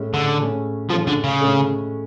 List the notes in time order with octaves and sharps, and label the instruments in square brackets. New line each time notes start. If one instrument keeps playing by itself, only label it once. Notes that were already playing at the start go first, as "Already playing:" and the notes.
Already playing: [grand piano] A2 G#3 C#4
[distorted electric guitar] D3
[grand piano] A2 G#3 C#4
[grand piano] A2 G#3 C#4 [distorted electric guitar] F3
[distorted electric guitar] D3
C#3
[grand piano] A2 G#3 C#4